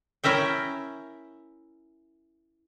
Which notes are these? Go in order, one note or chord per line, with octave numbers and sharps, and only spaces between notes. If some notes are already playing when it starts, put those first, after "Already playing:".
C#4 E4 A#4 E5 G5